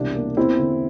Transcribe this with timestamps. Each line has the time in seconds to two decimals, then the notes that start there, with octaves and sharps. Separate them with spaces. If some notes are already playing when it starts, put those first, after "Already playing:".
Already playing: E1 C2 D4
0.15 A#3
0.37 E2 C4 E4
0.59 D3